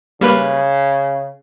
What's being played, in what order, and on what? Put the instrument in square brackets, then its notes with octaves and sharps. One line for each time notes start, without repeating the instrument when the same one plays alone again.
[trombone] C#3 [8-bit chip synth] G3 A#3 B4